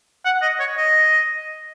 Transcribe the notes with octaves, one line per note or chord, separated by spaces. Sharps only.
F#5
D#5
C#5
D#5